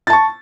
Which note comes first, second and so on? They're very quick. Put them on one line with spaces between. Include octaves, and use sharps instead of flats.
A6 A5 C#6